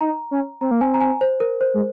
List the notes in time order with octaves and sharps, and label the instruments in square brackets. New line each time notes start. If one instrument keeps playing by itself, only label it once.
[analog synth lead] D#4 [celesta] A#5
[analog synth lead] C#4
[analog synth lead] C4 [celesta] A#5
[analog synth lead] A#3
[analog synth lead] C4 [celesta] G#5
[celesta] A#5
G#5
C5
A#4
C5
[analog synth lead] G#3